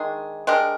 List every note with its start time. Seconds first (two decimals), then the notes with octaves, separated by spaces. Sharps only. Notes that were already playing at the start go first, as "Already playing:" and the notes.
Already playing: D#3 G#3 D4 G#4
0.47 G#3 D4 G4 A#4